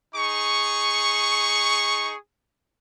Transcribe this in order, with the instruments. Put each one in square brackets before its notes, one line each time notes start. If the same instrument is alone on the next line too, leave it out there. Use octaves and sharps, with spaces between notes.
[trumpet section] D#4 G#4 C#6